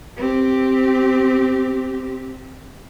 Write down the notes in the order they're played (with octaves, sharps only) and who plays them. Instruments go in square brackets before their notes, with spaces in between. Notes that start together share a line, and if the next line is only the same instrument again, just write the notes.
[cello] C4 G4